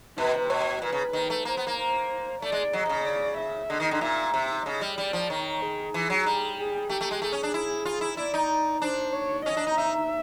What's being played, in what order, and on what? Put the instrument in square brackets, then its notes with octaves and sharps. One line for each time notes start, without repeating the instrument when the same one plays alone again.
[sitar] B2 [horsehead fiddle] B4
[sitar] C3
[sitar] B2 [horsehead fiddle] C#5
[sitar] A#2 [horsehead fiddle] B4
[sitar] C#3
D#3
A3
[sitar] A#3 [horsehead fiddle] C5
[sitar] B3
A#3
[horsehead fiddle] C5
[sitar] A3 [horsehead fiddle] D5
[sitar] G#3
[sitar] F#3 [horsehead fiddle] D#5
[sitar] C3
C#3
[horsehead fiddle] D5
E5
[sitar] D3 [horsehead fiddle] D#5
[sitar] D#3
D3
[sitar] A#2 [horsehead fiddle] E5
[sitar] C3 [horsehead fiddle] E5
[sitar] C#3 [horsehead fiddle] D#5
[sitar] G3
[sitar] G3 [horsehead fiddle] D5
[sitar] F3
[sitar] D#3 [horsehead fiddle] C#5
[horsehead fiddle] G#4
[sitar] E3
F#3
G3
[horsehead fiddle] G#4
[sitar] A3 [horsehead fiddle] G4
[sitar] A3
G#3
[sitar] A3 [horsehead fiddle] G#4
[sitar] C#4
D4
E4
F4
E4
[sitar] E4 [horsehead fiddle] D5
[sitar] D#4
[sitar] D4 [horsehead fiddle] C5
[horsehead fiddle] C#5
[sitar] C#4 [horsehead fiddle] D#5
[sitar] D4
D#4
[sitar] D#4 [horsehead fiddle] E5